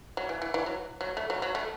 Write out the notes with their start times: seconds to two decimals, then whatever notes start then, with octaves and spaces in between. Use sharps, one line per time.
0.17 F#3
0.29 E3
0.42 E3
0.54 E3
0.66 F#3
1.01 F#3
1.17 A3
1.30 F#3
1.42 F#3
1.55 A3